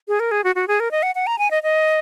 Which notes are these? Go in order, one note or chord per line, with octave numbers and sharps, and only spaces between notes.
G#4
A#4
G#4
F#4
F#4
G#4
A#4
D#5
F#5
F#5
A#5
G#5
D#5
D#5